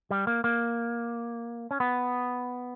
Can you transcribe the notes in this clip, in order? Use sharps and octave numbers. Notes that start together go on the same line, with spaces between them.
G3
A#3
A#3
C#4
B3